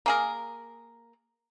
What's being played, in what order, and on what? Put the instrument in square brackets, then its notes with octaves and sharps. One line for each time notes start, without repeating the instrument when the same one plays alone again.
[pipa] A#3 G#4 A#4